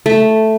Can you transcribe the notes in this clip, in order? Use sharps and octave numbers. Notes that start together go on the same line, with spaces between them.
A3